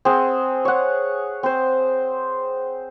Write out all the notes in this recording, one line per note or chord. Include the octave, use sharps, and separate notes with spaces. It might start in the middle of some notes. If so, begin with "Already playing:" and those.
C4 G#4 F#5
C#5 F#5
C4 C5